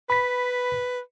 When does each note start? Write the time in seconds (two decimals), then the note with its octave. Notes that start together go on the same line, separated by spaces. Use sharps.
0.10 B4 B5 B6